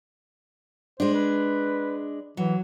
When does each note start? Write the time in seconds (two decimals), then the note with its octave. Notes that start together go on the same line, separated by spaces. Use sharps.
1.00 G#3 D4 C5
1.14 B4
2.37 E3 F#3